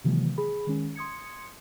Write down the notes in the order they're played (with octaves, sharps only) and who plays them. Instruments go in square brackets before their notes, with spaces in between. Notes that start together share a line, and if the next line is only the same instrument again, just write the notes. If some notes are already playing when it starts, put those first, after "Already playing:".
[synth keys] C3 D#3 E3 F#3 G#3 A#3
G#4 B5
D#3 G#3 C#4
C6 D#6 G#6 C#7